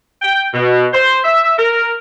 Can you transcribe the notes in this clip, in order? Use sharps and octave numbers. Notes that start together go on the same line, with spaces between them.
G5
B2
C5
E5
A#4